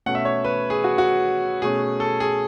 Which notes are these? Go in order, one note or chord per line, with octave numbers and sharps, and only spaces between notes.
B2 A3 C#4 F#5
E5
C#5
B4
G#4
F#4
F#4
B2 A3 C#4 G#4
A4
G#4